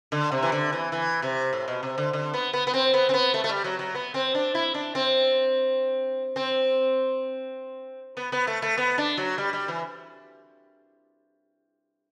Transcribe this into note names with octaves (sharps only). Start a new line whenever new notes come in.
D3
C3
E3
D3
E3
E3
C3
A2
B2
C3
D3
D3
B3
B3
B3
C4
B3
C4
B3
A3
A3
G3
F#3
F#3
B3
C4
D4
E4
D4
C4
C4
B3
B3
A3
A3
B3
D4
F#3
G3
G3
E3